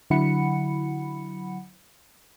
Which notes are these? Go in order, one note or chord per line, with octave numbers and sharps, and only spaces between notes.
D3 F#3 E4 F#5 B5 C#7